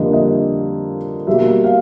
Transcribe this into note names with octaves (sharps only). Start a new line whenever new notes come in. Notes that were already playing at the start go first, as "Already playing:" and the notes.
Already playing: F2 D3 G3 A#3 D#5
D#5
B2 G3 A#3 E5
F5